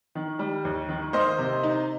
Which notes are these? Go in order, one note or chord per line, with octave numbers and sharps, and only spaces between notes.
D#3
G3
D#2
D#3
A#3 C5 D#5
C3
D#4